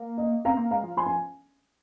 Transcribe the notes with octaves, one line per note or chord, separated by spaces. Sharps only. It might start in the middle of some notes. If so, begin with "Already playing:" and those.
Already playing: A#3
D#5
C4 F5 A#5
A#3
G#3 F5 A#5
F3
F3 G#5 C6
G#5